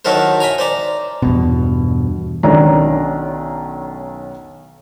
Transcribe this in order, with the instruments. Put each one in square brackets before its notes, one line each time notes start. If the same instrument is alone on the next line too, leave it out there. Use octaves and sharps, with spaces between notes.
[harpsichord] D#3 F#3 E4 A4 A#4 C5
E5 G5 G#5 A#5
C5 D5 A#5
[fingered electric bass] E2 G2 B2
[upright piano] B1 D#3 C#4 D4 A#5